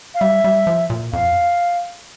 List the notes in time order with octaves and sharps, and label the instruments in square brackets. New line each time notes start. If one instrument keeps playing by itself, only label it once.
[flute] F5
[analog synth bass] G3 [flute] E5
[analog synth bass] G3
F3
A#2
[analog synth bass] F2 [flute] F5